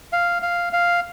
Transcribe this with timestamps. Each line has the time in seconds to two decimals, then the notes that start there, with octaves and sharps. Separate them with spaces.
0.13 F5
0.42 F5
0.73 F5